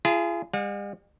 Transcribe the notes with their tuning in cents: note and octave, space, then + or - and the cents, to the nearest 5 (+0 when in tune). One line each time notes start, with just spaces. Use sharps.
F4 -40 G#4 +0 A5 +35
G3 +45 F#5 -45